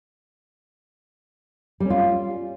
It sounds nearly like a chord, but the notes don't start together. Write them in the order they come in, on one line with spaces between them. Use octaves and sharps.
G3 C#4 F4